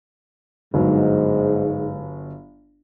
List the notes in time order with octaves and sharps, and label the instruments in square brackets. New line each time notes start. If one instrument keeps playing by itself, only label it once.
[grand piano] G1 F#3 [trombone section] G#2